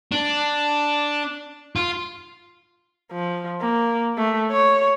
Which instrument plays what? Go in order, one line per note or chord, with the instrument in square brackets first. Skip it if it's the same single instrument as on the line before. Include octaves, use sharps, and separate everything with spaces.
[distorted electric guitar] D4
F4
[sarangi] F3
A#3
A3
C#5